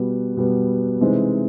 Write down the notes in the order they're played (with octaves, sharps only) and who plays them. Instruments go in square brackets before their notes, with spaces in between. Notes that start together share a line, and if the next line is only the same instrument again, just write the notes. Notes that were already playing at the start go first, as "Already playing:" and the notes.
Already playing: [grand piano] B2 G3 B3
B2 G3 B3
C3 E3 G#3 C4 D#4